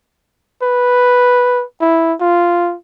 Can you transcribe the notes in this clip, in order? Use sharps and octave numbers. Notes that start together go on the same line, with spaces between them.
B4
E4
F4